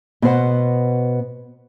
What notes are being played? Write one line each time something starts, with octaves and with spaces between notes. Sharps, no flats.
B2 B3 C5 F#5